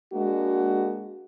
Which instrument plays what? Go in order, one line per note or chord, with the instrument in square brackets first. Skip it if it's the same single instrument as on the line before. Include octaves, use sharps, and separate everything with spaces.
[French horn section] G#3 A#3 D4 F#4